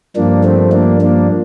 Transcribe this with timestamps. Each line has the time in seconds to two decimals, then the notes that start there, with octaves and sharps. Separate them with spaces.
0.16 G2 F3 A#3 D4
0.44 A3 C4
0.72 A#3 D4
1.01 A#3 D4